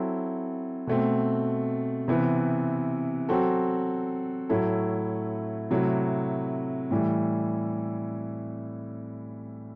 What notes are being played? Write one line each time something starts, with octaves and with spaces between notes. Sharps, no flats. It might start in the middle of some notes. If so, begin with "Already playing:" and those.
Already playing: F#3 C4 E4 A4
B2 A3 C4
C3 E3 B3
F#3 C4 F#4 A4
A2 F#3 A3 E4 A4
C3 F#3 A3 E4
A2 E3 G3